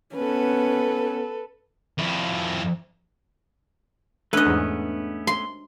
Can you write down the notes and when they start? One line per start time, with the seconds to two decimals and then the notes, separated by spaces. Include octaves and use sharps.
0.16 B3 C#4 A4 B4
1.98 F2 E4
4.33 A3 B3 C#4 D4 B4 D#5
4.46 E2 G#2
5.27 C6